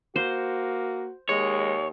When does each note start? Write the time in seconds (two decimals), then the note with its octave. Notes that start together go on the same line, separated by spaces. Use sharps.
0.16 A#3 F#4 C5
1.29 D#2 G#3 C#5